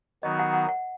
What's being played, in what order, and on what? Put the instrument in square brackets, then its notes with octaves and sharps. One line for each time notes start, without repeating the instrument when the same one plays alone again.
[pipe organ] D#3 F#3 B3 D#4 F#4 [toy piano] D#5
[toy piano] F#5
F#5
F#5